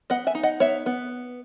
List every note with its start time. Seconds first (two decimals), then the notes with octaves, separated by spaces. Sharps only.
0.10 B3 D#5 F#5
0.27 E5 G#5
0.35 D#4
0.43 D#5 F#5
0.60 B3 C#5 E5
0.86 B3